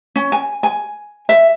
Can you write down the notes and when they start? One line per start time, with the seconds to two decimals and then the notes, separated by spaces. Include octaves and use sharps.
0.16 C#4
0.32 G#5
0.63 G#5
1.29 E5